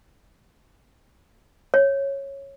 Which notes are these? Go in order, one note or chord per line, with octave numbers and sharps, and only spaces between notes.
C#5